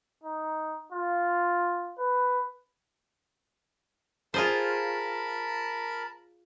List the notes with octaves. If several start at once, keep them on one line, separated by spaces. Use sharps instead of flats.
D#4
F4
B4
F4 G#4 A#4 C5 A5 B5